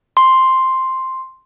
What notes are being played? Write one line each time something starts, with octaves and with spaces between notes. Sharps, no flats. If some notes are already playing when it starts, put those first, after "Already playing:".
C6